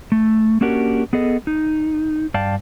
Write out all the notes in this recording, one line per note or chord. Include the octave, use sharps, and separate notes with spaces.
A3
A#3 C#4 D4 F#4 G4 A#4
B3 G#4 A4 D#5
D#4
G2 D5 F5 G5 A5